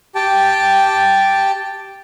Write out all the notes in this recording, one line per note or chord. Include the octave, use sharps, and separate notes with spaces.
G4 G5 A5